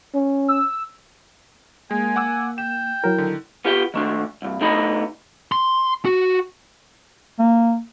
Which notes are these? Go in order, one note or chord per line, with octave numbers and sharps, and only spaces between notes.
C#4
E6
G#3 A#3 G#5
F#5 D6 E6
G5 E7
F#3 E4 A#4
D3 D#3
B3 F4 G4 E5 G5
D#3 A3 D4
C2 G2
D3 A3 B3 D#4 D#5 B5
C6
F#4
A#3